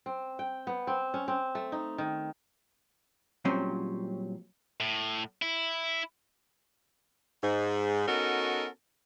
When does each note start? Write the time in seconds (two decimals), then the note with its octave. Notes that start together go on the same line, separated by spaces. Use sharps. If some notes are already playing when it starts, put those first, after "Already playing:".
0.06 C4
0.39 G5
0.67 B3
0.87 C4
1.14 C#4
1.28 C4
1.55 A3
1.72 D#4
1.98 D#3
3.45 A#2 F#3 G3 C4 C#4 C5
4.80 A2
5.42 E4
7.43 G#2
8.08 B3 C#4 D#4 F#4 A4 A#4